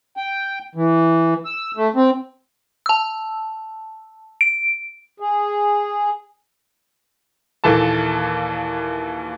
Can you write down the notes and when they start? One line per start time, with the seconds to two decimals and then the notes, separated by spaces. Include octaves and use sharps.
0.17 G5
0.75 E3
1.45 E6
1.77 A3
1.95 C4
2.86 A5 E6
4.41 D7
5.20 G#4
7.64 D#2 A#2 E3 A4 A5